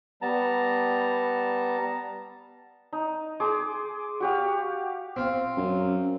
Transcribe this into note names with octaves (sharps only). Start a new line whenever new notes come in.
G3 B3 A5 A#5
D#4
G#4 C6 D6
F#4 G4 F5
C4 F4
F#2